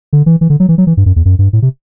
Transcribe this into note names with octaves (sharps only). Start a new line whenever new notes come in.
D3
E3
E3
D3
F#3
E3
F#3
E3
G2
F#2
E2
F#2
G2
A2
C3